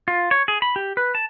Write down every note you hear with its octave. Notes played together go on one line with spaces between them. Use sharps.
F4
C#5
G#4
B5
G4
B4
A5